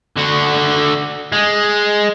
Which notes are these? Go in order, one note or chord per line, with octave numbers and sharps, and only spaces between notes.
D3 F#4
G#3